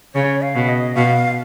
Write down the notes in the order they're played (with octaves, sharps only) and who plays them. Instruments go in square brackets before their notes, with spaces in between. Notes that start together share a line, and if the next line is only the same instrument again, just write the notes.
[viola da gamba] C#3 [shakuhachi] C#5
[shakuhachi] F5
[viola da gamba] B2
[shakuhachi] D#5
[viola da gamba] B2 [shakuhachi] F5